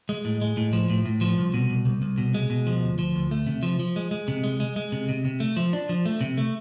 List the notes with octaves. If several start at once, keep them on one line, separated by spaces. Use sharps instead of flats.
G#3
A2
G#3
A2
F3
A2
A2
F3
C2
B2
C2
C2
C2
B2
G#3
B2
F3
D2
F3
D2
A3
C3
F3
F3
G#3
G#3
C3
G#3
G#3
G#3
C3
C3
C3
A3
F3
D4
F3
A3
C3
A3